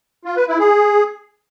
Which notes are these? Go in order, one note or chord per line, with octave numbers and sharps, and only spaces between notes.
F4
B4
E4
G#4